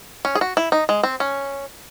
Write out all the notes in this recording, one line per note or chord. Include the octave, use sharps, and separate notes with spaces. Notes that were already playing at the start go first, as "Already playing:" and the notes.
C#4
G#4
F#4
E4
D#4
G#3
C4
C#4